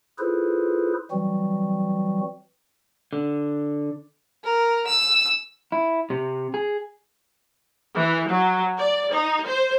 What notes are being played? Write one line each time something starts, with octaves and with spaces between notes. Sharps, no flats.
E4 F4 G#4 A4 B4 C5
E3 F#3 G3 C4 F#4
D3
A#4
E6
E4
C3
G#4
E3
F#3
D5
D#4
C5